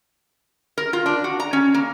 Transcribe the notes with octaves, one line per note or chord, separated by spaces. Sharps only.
A#4
F4
D4
F#4
A#5
C#4
A#3